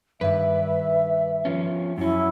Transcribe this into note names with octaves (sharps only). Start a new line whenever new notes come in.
G2 D#3 B4 D5 E5
F3 C#4
F#2 C#4 E4